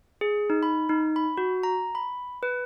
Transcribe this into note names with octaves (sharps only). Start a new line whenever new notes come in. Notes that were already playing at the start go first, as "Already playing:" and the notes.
G#4
D#4
B5
D#4
B5
F#4
A#5
B5
B4